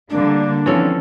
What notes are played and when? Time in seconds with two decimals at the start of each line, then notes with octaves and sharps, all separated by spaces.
0.10 D3 G3 A#3 D4
0.66 D3 E3 F3 C4 C#4 A4